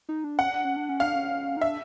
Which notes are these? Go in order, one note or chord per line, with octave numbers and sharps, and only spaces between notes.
D#4
D4
C#4 F#5
D4
C#4
D4
C#4
D4 F5
C#4
D#4
D4 E5